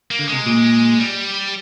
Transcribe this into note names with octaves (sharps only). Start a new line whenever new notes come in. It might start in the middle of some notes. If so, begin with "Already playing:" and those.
A#3
D3
C3 G#3
A#2
G3